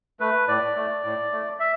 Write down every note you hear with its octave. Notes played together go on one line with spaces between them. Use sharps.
A3 B4
A2 D5
A3
A2
A3
E5